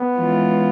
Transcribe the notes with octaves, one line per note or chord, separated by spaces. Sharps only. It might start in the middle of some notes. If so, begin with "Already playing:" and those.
Already playing: B3
E3 G#3 C#4 F4